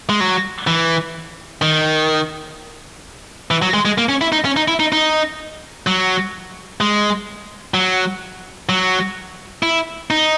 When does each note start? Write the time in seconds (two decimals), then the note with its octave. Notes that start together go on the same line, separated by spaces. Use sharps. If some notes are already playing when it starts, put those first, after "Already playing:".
0.09 G#3
0.20 F#3
0.67 E3
1.62 D#3
3.51 E3
3.62 F#3
3.74 G#3
3.85 G#3
3.98 A#3
4.09 C#4
4.21 E4
4.32 D#4
4.45 C#4
4.56 D#4
4.68 E4
4.80 D#4
4.92 D#4
5.87 F#3
6.81 G#3
7.74 F#3
8.69 F#3
9.63 E4
10.11 D#4